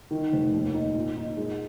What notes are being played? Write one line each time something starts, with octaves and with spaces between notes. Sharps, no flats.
D#3
F1
D#2
D#4
A#2
D#4
G#3